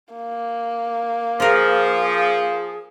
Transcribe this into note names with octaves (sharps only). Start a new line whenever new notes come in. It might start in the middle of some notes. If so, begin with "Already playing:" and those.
A#3
F3 F4 G#4 A#4